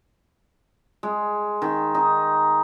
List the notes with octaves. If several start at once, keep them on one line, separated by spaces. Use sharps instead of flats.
G#3
D#3
D#4